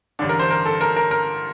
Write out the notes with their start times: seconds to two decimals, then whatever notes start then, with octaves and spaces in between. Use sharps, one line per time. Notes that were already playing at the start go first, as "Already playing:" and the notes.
0.19 A1 G2 D3 D4
0.29 A#4
0.39 C5
0.50 A#4
0.65 A4
0.81 A#4
0.97 A#4
1.11 A#4